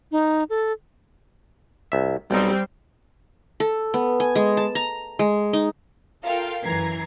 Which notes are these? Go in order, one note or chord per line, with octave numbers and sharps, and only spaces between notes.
D#4
A4
C2 E5
B1 G3 C4 D#4
A4
B3
G#5
G#3
A5
A#5
G#3
D#4
F4 A4 A#4 F5 G5
F#2 E3 A#5 G#6 C7